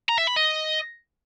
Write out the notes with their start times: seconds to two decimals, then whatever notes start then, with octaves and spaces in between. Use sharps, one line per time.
0.09 A#5
0.18 E5
0.27 B5
0.36 D#5